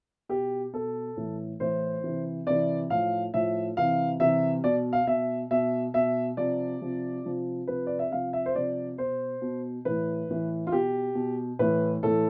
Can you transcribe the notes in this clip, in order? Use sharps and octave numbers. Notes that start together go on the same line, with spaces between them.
B2 G4
B2 A4
A2 E3
A2 E3 C5
C3 E3
C3 E3 D5
A2 F3 F5
A2 F3 E5
C3 E3 F5
C3 E3 E5
B2 D5
F5
B2 E5
B2 E5
B2 E5
C3 F3 D5
C3 F3
C3 F3
C3 F3 B4
D5
E5
C3 F3 F5
E5
C5
C3 F3 D5
B2 C5
B2
A2 E3 B4
A2 E3
F4
B2 G4
B2
A2 E3 B4
A2 E3 A4